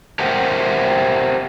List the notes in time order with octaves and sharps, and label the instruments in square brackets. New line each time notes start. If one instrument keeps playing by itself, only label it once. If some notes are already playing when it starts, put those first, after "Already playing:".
[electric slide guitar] G4 A#4 C5 E5 F#5 G5